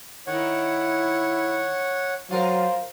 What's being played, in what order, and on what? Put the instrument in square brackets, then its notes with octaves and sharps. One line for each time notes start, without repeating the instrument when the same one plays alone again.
[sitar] D#3 [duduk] E4 [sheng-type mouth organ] C#5 F#5
[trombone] F#3 [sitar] F4 A#4 [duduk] C5